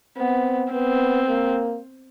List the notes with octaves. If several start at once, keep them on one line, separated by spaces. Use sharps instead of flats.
B3 C4
B3 C4
A#3